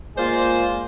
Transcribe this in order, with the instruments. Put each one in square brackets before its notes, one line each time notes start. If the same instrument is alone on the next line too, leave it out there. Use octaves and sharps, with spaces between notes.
[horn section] G#3 A#3 F4 C5 D5